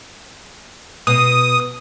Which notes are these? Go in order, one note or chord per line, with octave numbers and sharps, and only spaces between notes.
B2 D#6